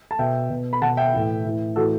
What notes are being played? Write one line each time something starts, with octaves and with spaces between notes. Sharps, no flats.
A5
B2 E5 G5
B2
B5
B2 F#5 A5
E5 G5
A2 E3
A2 E3
A2 E3 F#4 A4